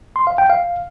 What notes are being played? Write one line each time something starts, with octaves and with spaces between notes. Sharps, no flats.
C6
F5
G5
F5